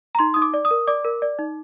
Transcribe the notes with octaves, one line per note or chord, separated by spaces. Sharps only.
A#5
D#4 C6
D#4 D#6
D6
D5
D#6
A#4
D5 D6
A#4
D5
D#4